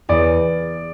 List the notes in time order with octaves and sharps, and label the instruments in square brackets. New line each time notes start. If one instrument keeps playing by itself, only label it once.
[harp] E2 [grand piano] D5